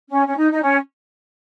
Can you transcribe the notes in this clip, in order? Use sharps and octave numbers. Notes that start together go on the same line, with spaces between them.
C#4
C#4
D#4
D#4
C#4